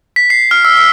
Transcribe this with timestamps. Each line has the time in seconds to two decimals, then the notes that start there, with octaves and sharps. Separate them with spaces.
0.16 B6
0.30 C7
0.51 F6
0.65 E6
0.77 E6